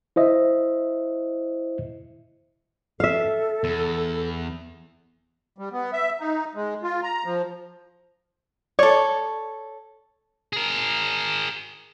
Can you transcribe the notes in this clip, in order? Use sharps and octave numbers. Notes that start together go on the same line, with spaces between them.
E4 C5 D#5 E5
A4 E5 F5
E2
G3
B3
E5
D#4
G#3
F4
A#5
F3
A4 C#5 D5
G#4 A#4